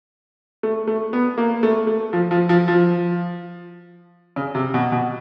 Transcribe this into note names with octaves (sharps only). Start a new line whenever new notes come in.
A3
A3
B3
A#3
A3
A3
F3
F3
F3
F3
C#3
C3
B2
B2